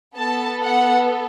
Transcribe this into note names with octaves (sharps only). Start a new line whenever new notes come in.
B3 A4 A5
F#5